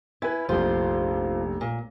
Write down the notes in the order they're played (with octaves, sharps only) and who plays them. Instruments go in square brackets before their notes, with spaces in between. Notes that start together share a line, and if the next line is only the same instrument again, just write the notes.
[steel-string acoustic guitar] E4 [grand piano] B4 G#5 G#6
[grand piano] F1 A#1 [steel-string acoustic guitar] F4 C5
[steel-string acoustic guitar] A#2